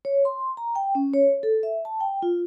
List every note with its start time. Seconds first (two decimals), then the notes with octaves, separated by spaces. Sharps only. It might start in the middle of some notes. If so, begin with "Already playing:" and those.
0.05 C#5
0.25 C6
0.57 A#5
0.75 G5
0.95 C#4
1.14 C#5
1.43 A4
1.63 E5
1.85 A5
2.00 G5
2.22 F4